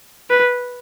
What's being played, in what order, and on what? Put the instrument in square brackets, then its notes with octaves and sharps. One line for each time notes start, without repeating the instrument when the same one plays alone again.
[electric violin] B4